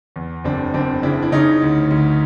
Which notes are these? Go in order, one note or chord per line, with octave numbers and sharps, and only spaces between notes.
E2
F#1 C4 D4
F#1 C4 D4
C#3 D4 E4
E4
C#3 C#4 D#4
D2
D2